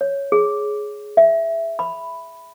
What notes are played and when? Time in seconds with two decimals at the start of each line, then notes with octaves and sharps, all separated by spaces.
0.01 C#5
0.32 G#4
1.17 E5
1.79 B5